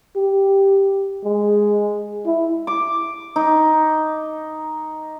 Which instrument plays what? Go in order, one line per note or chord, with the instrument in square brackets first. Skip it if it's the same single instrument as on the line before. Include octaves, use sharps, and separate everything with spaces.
[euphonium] G4
G#3
E4
[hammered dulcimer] D6
D#4